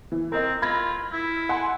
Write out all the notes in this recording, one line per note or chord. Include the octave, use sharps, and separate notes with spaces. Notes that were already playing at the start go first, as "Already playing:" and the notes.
E3
C4 A#4 D#5
F4 B5 G#6 A#6
E4
F#5 G#5 C6